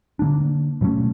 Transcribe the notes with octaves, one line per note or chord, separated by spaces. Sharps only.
D3 F#3 A#3 D4
B2 F#3 A3 C#4